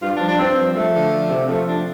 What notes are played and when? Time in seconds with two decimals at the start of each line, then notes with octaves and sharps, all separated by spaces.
0.02 G2 F4
0.14 D4
0.21 F3
0.27 D4
0.39 G2 C4
0.57 F3
0.75 F3 A3
0.94 D3
1.12 F3
1.30 C3
1.49 F3 A3
1.66 C3 D4